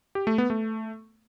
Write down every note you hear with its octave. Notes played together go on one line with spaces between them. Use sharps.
G4
A3
B3
A3